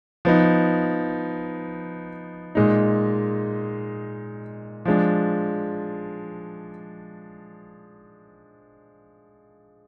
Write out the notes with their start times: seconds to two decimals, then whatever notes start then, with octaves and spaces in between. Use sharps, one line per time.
0.25 F3 B3 D#4
2.55 A#2 G#3 D#4
4.85 F3 G#3 D4